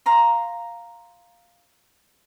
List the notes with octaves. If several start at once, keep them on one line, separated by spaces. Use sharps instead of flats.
F5 A#5 C6